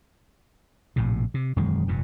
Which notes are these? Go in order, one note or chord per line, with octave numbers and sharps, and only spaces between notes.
A#1 A2 C3
C3
E1 F#2 D#3 G#3
F1 G2 A#2